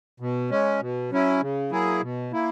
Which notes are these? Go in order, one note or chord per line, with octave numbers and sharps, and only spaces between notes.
B2
G#3 C#4
B2
F#3 C#4 E4
C#3
F#3 A#3 E4 G#4
B2
A#3 E4